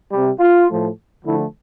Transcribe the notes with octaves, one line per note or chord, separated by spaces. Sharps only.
C3 G3
F4
A2 F3 A3
D3 F3 A3 E4